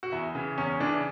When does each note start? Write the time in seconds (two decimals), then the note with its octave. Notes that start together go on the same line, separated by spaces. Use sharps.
0.03 F#4
0.12 E2 E4
0.35 C#3 E3
0.58 E2 C#4
0.80 C#3 E3 D4